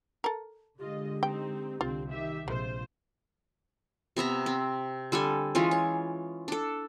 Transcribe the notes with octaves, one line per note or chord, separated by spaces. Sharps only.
A4 A#4
D3 G#3 F4 G4 D#5
C4 D#4 G5
C2 D3 C4 F4
D#3 G4 E5
A#1 C3 G#3 F4 C5
C3 B3 E5 A#5
C4
D3 G3 A4 G#5
E3 G#3 C#4 F4
C#5
D4 A4